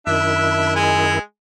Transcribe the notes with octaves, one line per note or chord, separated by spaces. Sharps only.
F#2 D#3 D4 E4 E5
G#3 G#5